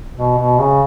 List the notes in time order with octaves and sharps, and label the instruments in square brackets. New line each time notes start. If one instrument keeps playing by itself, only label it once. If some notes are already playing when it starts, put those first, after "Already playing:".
[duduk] B2
B2
C#3